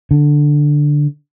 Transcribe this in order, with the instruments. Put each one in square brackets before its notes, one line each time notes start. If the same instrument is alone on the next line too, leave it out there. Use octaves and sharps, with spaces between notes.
[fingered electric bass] D3